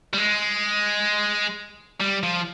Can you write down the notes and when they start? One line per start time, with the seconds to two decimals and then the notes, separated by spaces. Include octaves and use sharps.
0.13 G3
0.18 G#3
2.00 G3
2.23 F3